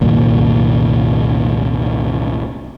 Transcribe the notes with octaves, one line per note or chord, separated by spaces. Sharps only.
C2 F#2 A#2 D#3